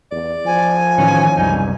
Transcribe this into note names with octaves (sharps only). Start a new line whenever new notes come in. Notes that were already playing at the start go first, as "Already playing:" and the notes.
E2 D5
F3 G#5
A2 D#3 E3 C#4
F#1 C2 G3 D#4